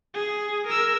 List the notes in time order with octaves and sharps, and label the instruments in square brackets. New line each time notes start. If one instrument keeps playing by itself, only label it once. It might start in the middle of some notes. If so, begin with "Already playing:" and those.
[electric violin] G#4
A#4 E6